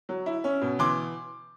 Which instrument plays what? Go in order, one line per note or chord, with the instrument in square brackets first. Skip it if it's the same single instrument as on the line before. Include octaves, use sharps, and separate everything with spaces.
[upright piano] F#3
E4
C#4
B2
E3 C6 D6